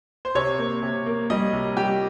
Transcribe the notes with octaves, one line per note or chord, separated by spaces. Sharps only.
C5
C3 C#5
A#3
C3
A#3
G3 D#5
C3
G3 G4